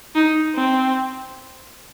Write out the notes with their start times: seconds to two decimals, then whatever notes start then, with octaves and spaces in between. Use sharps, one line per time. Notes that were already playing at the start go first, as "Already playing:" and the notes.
0.15 D#4
0.55 C4